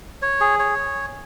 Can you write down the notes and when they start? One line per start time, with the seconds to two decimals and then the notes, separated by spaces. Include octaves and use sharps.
0.22 C#5
0.41 G#4
0.59 C#5